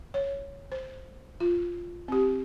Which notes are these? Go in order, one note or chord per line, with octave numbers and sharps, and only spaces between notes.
C#5
C5
F4
C4 G4